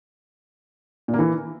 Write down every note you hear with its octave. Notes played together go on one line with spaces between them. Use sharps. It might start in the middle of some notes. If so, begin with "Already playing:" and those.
A#2
A#3
E3